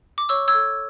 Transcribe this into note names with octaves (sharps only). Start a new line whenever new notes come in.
D6
C#5 C#6 E6
E6 G#6
A4